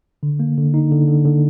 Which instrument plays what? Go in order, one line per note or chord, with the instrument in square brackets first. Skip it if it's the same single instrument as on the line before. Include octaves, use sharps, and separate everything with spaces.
[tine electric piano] D3
A#3
D3
D#4
D3
D3
D3